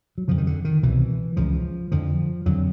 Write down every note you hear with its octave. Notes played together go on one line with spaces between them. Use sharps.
F#3
F2 C#3 F3
D#3
D3
D#3
C2 B2 E3
C#2 C#3 F3
F2 D3 F3
F2 D3 F#3